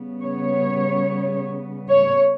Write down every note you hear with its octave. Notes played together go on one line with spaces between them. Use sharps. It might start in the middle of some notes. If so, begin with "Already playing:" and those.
Already playing: C#3 G3 B3
C#5
C#5